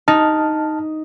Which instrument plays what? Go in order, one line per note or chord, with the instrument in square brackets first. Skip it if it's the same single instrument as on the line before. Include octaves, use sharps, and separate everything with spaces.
[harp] D#4 [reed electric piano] D#5 A5 F6